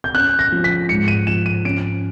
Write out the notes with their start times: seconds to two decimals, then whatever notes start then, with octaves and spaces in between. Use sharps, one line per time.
0.04 G6
0.14 C#4 F#6
0.39 A#6
0.52 F3
0.64 B6
0.89 G#2 C#7
1.08 D#7
1.27 F3 E7
1.46 D#7
1.65 C#4 D7